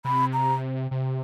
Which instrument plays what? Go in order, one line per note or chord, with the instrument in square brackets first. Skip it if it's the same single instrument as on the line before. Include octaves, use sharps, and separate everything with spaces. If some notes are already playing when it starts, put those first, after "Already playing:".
[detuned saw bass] C3 [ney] B5
[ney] A#5
[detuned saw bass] C3